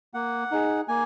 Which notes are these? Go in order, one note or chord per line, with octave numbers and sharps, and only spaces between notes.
A#3 F#5
D#4 G#4
A#3 G#5